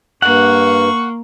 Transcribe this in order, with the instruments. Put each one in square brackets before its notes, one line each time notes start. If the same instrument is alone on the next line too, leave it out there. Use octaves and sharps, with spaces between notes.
[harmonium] G2 [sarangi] A#3 [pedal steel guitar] F#5 [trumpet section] C#6